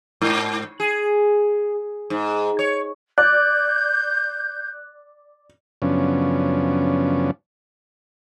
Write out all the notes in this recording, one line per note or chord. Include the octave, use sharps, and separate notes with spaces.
G#2
G#4
G#2
C#5
D5 F#6 G6
F#2 C#3 F3 B3 C#4 D4